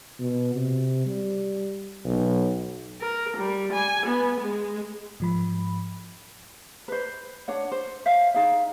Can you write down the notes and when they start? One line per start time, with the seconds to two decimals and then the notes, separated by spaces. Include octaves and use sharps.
0.20 B2
0.55 C3
1.06 G3
2.05 B1
3.01 A#4
3.37 G3
3.73 G#5
4.06 B3
4.41 G#3
5.20 G#2 F3 B5
6.88 B4 C5
7.48 D4 C#5 F#5
7.72 C5
8.06 C5 C#5 E5 F5
8.34 D#4 G#4 F5